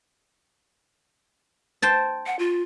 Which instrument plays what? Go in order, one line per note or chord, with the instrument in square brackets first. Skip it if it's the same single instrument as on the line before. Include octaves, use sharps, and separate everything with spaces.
[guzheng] C5 G5 A5
[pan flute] F#5
F4